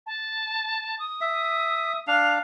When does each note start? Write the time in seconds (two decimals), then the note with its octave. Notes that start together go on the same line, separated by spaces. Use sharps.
0.06 A5
0.99 D#6
1.21 E5
2.07 D4 F5 F7